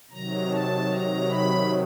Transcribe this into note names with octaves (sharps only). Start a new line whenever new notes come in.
C3 D#3 F#3 A#5
A5
A#5
B5